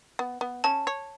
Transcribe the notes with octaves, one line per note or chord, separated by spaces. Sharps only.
B3
B3
C#4 A5
C#5